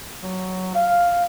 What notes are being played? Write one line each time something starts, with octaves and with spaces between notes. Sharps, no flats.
F#3
F5